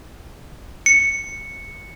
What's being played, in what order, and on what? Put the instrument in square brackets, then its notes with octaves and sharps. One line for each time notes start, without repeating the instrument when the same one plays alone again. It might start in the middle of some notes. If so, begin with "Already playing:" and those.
[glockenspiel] C#7